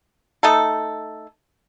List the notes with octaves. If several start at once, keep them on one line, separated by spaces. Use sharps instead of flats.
A3 D#4 A4